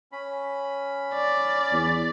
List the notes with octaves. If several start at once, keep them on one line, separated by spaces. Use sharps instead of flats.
C#4 B5
D5
E2